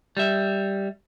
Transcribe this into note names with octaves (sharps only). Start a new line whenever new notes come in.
G3 E5